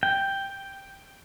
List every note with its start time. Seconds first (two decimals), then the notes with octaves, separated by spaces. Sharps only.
0.03 G5